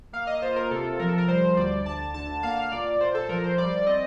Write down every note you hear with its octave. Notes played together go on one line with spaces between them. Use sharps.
A#3 F5
D#5
F4 C5
A#4
C3 A4
F3 A#4
A4
A#4
G3 C5
D2 D5
D2 A5
D3 A5
A#3 F5
A#2 D5
A#2 C5
A4
F3 A#4
C5
G3 D5
C4 D#5